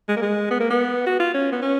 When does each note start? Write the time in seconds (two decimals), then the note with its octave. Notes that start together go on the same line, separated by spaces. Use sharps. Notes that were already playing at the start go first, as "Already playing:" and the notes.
0.09 G#3
0.17 A#3
0.22 G#3
0.51 B3
0.60 A#3
0.71 B3
1.07 F#4
1.20 F4
1.34 C#4
1.52 B3
1.62 C#4